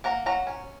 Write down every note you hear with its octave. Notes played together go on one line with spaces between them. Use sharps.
A#3 F#5 A#5
F#3 F#5 A#5
C#4